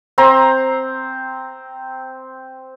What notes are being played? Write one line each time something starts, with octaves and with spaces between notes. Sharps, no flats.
C4 C5 A#5